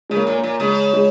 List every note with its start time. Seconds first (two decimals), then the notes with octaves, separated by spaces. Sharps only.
0.10 C#3 G#3
0.16 A#3
0.27 A#2
0.38 A#3
0.44 A#2
0.60 C#3 G#3
0.94 G#3